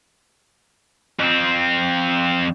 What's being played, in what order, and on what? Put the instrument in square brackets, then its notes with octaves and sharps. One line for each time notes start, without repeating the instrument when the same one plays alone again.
[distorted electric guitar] F2 C4